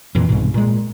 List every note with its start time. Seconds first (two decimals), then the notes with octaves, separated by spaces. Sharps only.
0.15 F2 A#2 E3
0.29 C2 G#2 B2
0.54 A#2 G#3